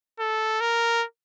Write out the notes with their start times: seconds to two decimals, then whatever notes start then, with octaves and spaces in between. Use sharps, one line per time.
0.19 A4
0.60 A#4